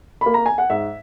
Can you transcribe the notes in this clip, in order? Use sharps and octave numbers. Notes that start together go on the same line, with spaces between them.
A#3 B5
A#5
G#5
F#5
G#2 E5